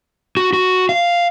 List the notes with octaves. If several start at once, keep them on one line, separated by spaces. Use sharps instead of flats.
F#4
F#4
F5